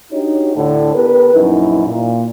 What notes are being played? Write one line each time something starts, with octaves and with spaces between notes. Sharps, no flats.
D4 D#4 F#4 G4 C#5
D2 A2 D3
B3 G4 A#4 B4
A#1 F#2 D#4 E4
A#2